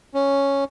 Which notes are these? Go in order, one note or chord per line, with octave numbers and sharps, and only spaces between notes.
C#4